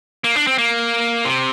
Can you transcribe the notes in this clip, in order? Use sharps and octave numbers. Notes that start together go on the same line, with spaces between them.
A#3
D4
C4
A#3
C3